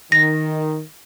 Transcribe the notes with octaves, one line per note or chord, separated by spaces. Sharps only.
D#3 A#6